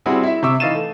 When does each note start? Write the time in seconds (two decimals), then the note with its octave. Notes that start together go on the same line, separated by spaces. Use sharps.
0.06 G3 C4 E4 F#4 G#4
0.23 E4 E5
0.43 C3 E5 C#6 D6 E6
0.60 E3 D#4 F5 A6 D#7 E7
0.75 A3